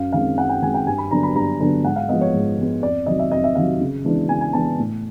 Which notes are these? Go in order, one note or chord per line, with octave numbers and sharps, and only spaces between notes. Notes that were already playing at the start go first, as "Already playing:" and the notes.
Already playing: F#2 F5
D#3 G#3 C4 F5
F#2 F#5
G5
D#3 G#3 C4 G#5
G5
G2 G#5
B5
D3 F#3 B3 D4 A#5
B5
G2 A#5
D3 F#3 B3 D4
G#2 F#5
F5
F3 G#3 B3 D#5
C#5
G#2
F3 G#3 B3
F2 D5
C3 D#3 F#3 D#5
E5
F2 D#5
E5
C3 D#3 F#3 F5
C#3
E3 G#3 B3 D4
C#3 G#5
G#5
E3 G#3 B3 D4 A5
A2